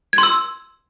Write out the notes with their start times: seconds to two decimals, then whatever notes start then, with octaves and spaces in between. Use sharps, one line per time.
0.13 G#6
0.18 C6
0.23 E6